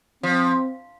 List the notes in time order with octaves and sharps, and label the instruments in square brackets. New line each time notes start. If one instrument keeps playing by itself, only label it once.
[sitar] F3 [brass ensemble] C4